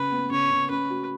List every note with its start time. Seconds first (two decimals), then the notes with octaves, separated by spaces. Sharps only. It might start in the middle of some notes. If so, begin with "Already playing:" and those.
Already playing: C#3 B4
0.11 B3
0.31 C#3 C#5
0.51 C#3
0.70 C#4 B4
0.90 F#4